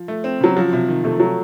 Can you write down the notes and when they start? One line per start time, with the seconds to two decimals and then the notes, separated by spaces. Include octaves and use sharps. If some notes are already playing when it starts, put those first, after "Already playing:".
Already playing: F3
0.08 A3
0.24 C4
0.41 C#3 F#3
0.56 F3 F#3
0.73 C3
0.88 D#3
1.04 C3 A3
1.20 F#3